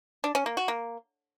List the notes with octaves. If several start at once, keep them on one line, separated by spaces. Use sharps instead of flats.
D4
C#4
A#3
F#4
A#3